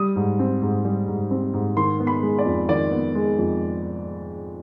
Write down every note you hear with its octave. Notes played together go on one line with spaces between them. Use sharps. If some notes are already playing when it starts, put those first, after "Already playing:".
Already playing: G3 D#6
G#2
C4
G#2
G3
G#2
C4
G#2
D#3 C6
B3
B5
G#3
D5
F2
D#3 D5
B3
G#3
F2